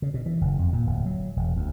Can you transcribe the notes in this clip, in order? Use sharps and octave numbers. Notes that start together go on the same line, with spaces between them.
C#3
B2
E3
F#1
F2
A#2
D1
F#3
E1
D2